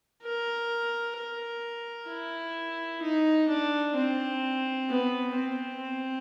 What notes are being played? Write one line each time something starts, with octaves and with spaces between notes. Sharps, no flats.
A#4
A#4
E4
D#4
D4
C4
B3
C4